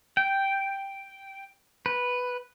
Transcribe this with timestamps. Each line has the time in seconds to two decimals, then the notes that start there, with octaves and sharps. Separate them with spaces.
0.17 G5
1.86 B4